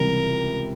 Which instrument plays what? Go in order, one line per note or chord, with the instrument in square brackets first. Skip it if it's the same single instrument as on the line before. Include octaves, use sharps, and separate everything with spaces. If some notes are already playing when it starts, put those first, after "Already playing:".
Already playing: [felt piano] C#2 C3 E3 G3 [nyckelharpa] A#4